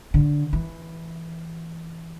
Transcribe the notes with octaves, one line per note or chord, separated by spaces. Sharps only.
D3
E3